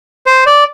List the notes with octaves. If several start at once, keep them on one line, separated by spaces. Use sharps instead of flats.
C5
D5